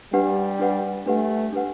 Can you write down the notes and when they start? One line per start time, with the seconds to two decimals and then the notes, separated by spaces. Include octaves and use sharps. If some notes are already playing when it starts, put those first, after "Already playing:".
0.13 G3 D4 G4 B4 F#5
0.59 D4 G4 B4 F#5
1.06 A3 D4 G4 B4 F#5
1.52 D4 G4 B4 F#5